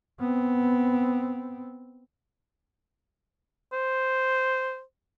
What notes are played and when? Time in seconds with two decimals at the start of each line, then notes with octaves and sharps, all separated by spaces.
0.20 B3 C4
3.73 C5